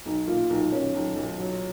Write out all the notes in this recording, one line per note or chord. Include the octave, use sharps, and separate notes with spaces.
B1 D#4
A#2 F4
B1 D#4
B1 C#4
B1 D#4
B1
F#3